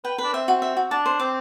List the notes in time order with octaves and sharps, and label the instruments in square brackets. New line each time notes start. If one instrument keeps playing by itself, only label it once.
[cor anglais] B4 [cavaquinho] G5
[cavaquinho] B4
[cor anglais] D4
[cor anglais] C4 [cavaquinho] E5
[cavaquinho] F#4
E5
F#4
[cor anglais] D4 [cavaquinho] A5
[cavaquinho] C5
[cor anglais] C4 [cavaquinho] D6